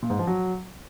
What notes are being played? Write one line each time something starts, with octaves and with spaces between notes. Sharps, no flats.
A#2
G#2
F3
F#3